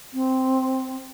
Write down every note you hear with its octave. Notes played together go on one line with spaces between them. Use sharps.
C4